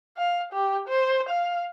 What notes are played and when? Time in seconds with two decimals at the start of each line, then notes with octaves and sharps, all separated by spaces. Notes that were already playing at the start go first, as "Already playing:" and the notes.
0.17 F5
0.53 G4
0.88 C5
1.29 F5